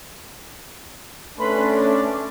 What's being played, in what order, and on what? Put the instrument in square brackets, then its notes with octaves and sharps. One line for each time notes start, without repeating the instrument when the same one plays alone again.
[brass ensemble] A3 C#4 D4 [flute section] B4 B5 C6
[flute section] D6